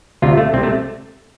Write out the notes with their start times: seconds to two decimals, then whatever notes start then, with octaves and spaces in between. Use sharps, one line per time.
0.22 D2 C3 F4
0.37 A3
0.53 C2 C4
0.58 C3
0.63 A3